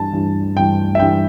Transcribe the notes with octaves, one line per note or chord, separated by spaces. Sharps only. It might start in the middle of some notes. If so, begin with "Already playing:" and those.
Already playing: G2 E3 A5
G2 E3
G2 E3 G5
E5
G2 E3 G5